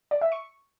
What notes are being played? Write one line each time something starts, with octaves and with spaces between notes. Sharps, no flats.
D5
E5
C#6